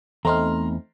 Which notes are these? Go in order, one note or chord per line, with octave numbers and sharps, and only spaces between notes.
E2 A3 C4 D#4 A#5 C6 F6